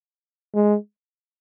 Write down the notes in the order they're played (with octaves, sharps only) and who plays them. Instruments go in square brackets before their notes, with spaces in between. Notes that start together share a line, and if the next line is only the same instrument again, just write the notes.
[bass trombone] G#3